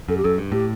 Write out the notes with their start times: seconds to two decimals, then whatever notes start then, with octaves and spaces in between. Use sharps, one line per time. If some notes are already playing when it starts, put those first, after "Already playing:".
0.09 F#2 A4
0.17 G4
0.24 F#2 A4
0.38 G2
0.52 A2 G4